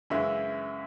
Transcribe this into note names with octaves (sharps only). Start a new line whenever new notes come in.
F#2 C#3 E3 G#3 E5